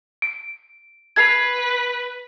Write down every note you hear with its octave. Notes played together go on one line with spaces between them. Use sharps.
D7
B4 G#6 C7 F7